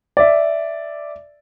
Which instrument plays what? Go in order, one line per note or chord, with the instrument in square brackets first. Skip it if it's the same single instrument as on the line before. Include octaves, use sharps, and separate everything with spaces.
[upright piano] D5 E5